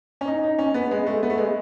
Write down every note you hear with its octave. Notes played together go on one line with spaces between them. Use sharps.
C#4
D#4
D#4
C#4
B3
G#3
A3
B3
A3
G#3